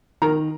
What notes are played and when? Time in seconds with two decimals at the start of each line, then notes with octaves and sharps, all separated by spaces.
0.22 D#3 A#4 A#5